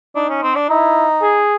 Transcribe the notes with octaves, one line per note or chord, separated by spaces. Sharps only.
D4 D#4
C#4
C4
D4
D#4 E4
G#4